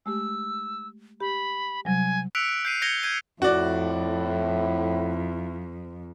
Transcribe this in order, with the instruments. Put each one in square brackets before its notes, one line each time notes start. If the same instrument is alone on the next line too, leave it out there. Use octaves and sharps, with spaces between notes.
[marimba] G#3 A3 G4 [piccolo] E6
[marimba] G4 [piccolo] B5
[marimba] C3 F#3 G3 [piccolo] G#5
[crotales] E6 F#6 B6 C#7 D7 F7
G6 C7 D#7
G6 G#6 A#6 C#7 F7 G7
G6 G#6 D#7
[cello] F2 [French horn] A2 [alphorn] E4 [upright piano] F#4 D5